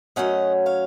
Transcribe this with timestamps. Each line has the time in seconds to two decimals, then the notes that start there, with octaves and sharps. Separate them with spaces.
0.16 F#2 C#3 F#3 A3 C#4 D#5 F#5
0.66 C#5 F5